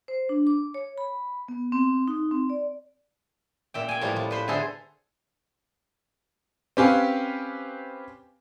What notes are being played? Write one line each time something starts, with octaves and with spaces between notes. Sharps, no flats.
C5
D4
D6
C#5
B5
B3
C4
D#4
C4
D5
A#2 E5 G5
G5 G#5
A2 F3 G3 A#3 B3
F3
B4 C5 B5
D3 E4 G#4 A4 C5
C4 C#4 G4 B4 F5 G#5